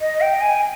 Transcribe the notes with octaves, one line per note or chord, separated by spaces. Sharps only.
D#5
G5
G#5